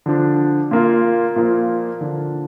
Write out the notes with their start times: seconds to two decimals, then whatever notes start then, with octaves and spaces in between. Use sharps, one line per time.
0.06 D3 F3 D4
0.71 A#2 A#3 F4
1.36 A#2 F3 A#3 F4
2.01 D3 F3 D4